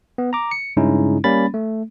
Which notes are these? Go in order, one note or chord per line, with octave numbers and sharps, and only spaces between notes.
B3
A#5 D6
C#7
G2 C#3 G#3 C#4 D#4 E4
G3 A#3 C#4 B5 A6
A3